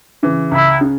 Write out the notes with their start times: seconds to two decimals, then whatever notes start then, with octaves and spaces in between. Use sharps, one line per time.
0.23 C#3 E3
0.51 C#2 E4
0.81 C#3